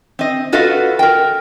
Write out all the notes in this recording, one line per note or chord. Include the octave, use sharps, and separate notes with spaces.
C4 D#5
F4 F#4 A4 B4 D#5 F5
A#4 G5